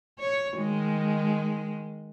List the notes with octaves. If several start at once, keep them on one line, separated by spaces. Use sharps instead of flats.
C#5
D#3 G#3